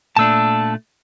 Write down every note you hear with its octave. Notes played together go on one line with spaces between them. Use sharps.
A#2 A3 D4 A5 E6